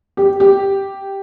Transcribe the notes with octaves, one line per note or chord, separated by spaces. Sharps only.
G4
G4